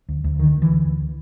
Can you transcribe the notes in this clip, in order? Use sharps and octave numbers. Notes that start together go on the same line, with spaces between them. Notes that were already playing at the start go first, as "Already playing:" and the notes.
D2
D2
D3 D#3
D2
E3
D3
D2